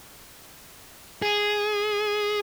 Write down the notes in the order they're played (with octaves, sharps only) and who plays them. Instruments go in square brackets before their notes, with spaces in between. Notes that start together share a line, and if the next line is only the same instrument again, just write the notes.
[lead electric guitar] G#4